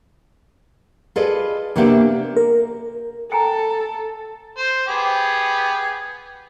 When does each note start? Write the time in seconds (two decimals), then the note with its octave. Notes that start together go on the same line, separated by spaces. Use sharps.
1.16 F4 G#4 A4 B4 D5 D#5
1.76 C3 A#3 B3 D4 G4 E5
2.37 A#4
3.32 A4 G5 G#5 A#5
4.58 C5
4.88 B3 G4 G#4